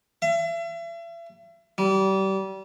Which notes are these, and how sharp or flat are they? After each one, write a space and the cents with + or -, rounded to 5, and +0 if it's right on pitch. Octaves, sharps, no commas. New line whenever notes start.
E5 +40
G3 -30